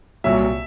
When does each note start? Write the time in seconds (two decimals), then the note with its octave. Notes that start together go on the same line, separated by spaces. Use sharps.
0.24 C2 A#2 F#3 E5